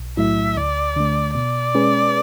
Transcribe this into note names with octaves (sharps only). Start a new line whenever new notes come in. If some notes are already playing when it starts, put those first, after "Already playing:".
Already playing: B1
A2 F#3 A3 E4 E5
D2 D5
D3 A3
B2 D5
G#3 C#4 G#4 B4